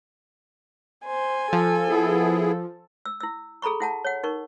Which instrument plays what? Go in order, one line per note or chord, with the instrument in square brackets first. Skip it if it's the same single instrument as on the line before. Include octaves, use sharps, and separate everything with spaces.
[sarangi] C5 [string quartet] G#5
[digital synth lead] F3 [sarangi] A4
[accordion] B3 E4 G#4
[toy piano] E6
E4 E6
G#4 A4 A#5 B5 C#6
E4 F#5 A5
C#5 F#5
D#4 A#4 C#6